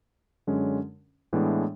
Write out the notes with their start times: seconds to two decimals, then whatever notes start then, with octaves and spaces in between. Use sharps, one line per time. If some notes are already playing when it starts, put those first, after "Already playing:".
0.47 F#2 D3 G#3 C#4
1.33 A2 E3 G#3 B3 D4